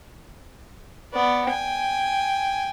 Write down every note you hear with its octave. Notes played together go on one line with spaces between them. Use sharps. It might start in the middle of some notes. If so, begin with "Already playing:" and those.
B3 D5
G5 G#5